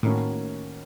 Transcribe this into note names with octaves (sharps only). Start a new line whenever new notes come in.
A2 D#3 A#3 C#4 F#4